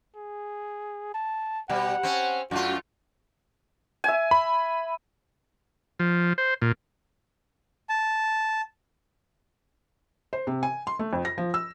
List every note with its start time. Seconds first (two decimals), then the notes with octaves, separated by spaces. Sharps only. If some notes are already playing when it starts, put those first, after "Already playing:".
0.16 G#4
1.14 A5
1.70 B2 G3 F#5
2.03 C4 C#4
2.51 F#2 A3 F4 F#4
4.04 E5 G#5
4.31 B5
6.00 F3
6.38 C5
6.62 A#2
7.89 A5
10.33 C5
10.47 C3
10.63 G#5
10.87 C6
10.99 A3
11.13 F2
11.25 A#6
11.38 F3
11.54 E6